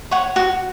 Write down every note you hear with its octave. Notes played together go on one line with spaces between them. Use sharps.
C#5 F#5
F#4